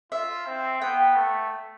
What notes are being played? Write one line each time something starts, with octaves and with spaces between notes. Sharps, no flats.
F4 E5
C4
B3 G5
A3